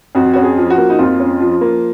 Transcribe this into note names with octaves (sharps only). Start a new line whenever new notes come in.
F2 F#4
C#4 F#4
G#4
F3
F#4
A#3
D#4
F2 F4
C#4
F3
A#3